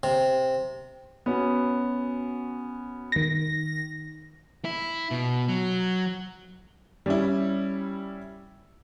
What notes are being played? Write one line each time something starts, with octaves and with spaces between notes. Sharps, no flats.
C3
B3 C#4 F#4
D#3 A#6
E4
B2
F#3
G3 C#4 E4